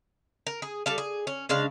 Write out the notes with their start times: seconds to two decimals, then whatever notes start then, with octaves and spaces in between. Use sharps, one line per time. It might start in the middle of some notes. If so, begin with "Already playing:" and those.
0.47 A#4
0.62 G#4
0.86 G3 A4 F5
0.98 G#4
1.27 C#4
1.49 C#3 G#3 D4 F5